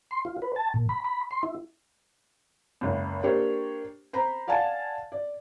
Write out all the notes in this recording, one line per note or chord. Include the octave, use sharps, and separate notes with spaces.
C6
F4
B4
A5
A#2
B5
B5
C6
E4
F#1 C#2
A#3 D4 G4 C5 C#5
C5 A#5 B5
D5 F5 F#5 G#5 A5
D5